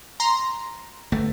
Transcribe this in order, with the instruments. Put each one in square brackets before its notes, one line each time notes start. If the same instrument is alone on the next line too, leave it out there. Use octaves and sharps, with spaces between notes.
[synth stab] A#5 C6
[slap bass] G1 A3